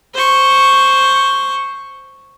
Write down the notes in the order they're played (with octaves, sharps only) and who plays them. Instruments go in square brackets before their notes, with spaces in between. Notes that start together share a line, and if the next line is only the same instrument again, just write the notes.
[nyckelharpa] C5 C#6